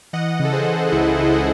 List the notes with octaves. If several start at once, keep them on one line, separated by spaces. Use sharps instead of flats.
E3 D#5 F#5
C#3
A4
G#4 C5
C#3
C#2 E4 G#4
C#3
E4 G#4